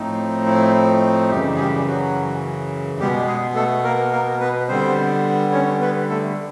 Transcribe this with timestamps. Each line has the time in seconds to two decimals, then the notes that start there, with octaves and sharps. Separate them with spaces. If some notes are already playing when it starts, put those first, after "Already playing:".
Already playing: A2 F3 A3 C4 D#4
0.46 E4
1.31 F#2 C#3 E3 G3 G4
1.55 G#4
1.59 G3 G4
1.87 F#3 F#4
3.00 B2 G3 G#3 B3 G4
3.27 G#3 G#4
3.55 A3 A4
3.84 A#3 A#4
4.12 A#3 A#4
4.40 B3 B4
4.68 D3 G3 B3 C4 C5
5.52 C#4 C#5
5.81 B3 B4
6.09 A3 A4